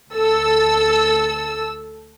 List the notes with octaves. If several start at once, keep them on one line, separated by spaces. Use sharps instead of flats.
D2 A4 E6